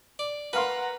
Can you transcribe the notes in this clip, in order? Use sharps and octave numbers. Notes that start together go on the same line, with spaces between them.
D5
A#4 B4 F5 F#5 A#5 C6